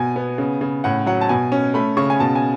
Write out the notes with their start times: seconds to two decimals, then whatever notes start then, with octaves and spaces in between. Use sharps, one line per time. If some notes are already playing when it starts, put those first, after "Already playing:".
Already playing: B2 G#5
0.16 B3
0.38 C#3
0.61 C#3
0.84 A2 F#5
1.06 F#3 F#5
1.21 A5
1.29 B2 G#5
1.52 C#4
1.74 A3 B5
1.97 C#3 C#6
2.10 G#5
2.20 B2 A5
2.35 G#5